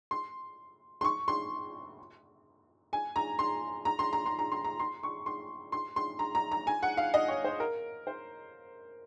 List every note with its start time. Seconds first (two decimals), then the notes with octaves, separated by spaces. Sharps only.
0.11 C6
1.01 C6
1.04 C#6
1.28 C6
2.93 G#5
3.16 A#5
3.39 C6
3.85 A#5
3.99 C6
4.13 A#5
4.26 C6
4.39 A#5
4.52 C6
4.64 A#5
4.80 C6
5.03 C#6
5.26 C6
5.72 C6
5.96 C6
6.19 A#5
6.35 A#5
6.52 A#5
6.67 G#5
6.83 F#5
6.97 F5
7.14 D#5
7.28 C#5
7.45 C5
7.60 A#4
8.07 C5